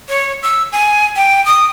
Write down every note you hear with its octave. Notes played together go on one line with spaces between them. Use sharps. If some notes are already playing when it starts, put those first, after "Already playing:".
C#5
E6
G#5
G5
D#6